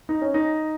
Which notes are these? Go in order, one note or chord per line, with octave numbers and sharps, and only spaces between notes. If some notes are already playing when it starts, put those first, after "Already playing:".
D#4
C#4
D#4